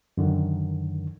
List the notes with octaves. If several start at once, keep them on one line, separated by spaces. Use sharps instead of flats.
F#2 D3 D#3